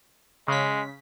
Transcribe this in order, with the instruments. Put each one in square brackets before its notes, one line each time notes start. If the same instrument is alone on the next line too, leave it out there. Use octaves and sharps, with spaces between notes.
[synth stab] C#3 B6 [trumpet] G#3